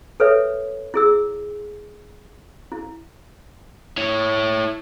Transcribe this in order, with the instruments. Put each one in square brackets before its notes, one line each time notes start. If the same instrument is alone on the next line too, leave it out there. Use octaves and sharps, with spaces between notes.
[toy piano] A4 B4 C#5 E5
E4 G#4 E6
E4
[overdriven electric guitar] E4 C#5